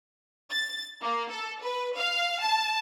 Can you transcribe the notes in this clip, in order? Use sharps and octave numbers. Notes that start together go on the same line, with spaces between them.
A6
A#3
A4
B4
F5
A5